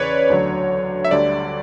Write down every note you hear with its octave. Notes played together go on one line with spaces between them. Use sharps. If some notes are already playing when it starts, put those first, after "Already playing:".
Already playing: E2 C#3 E3 B4 C#5 D5
D2 D3 F#3
E5
D2 D3 G3 D5